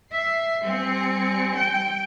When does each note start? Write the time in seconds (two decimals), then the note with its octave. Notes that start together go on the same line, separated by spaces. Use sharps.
0.12 E5 C7
0.64 G3 C4 G#5 C#7
1.55 G5